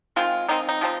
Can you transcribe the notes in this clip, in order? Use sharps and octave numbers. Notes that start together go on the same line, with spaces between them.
D#3 G#3 C4 F4
D#3 G#3 C4 D#4
D#4
C3 F3 C4 D#4